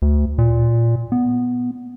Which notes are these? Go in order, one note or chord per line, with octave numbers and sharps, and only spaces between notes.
D2
A#2
B3